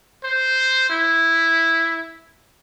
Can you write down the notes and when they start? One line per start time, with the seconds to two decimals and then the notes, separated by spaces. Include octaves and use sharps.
0.24 C5
0.90 E4